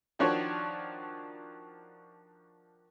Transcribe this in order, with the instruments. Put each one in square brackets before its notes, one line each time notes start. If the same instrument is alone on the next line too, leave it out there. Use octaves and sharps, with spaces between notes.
[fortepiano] D#3 F3 D4 F#4 C#5